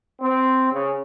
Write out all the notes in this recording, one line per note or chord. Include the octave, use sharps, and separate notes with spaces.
C4
C#3